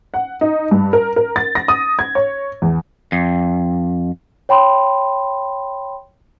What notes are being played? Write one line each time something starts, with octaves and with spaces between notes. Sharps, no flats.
F#5
D#4
G2
A#4
A#4
A6
A#6
D#6
G#6
C#5
E2
F2
C#5 G5 B5 C6